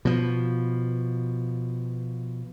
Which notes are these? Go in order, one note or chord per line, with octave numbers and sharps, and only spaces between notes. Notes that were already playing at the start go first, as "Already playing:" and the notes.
B2 F3